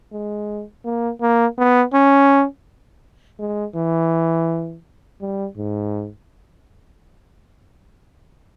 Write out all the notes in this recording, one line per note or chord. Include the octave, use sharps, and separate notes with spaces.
G#3
A#3
A#3
B3
C#4
G#3
E3
G3
G#2